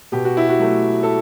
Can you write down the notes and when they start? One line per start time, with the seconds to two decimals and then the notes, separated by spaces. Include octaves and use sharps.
0.12 B2 G4
0.25 F#4
0.37 E4
0.49 F#4
0.60 F#3 A3
1.03 A4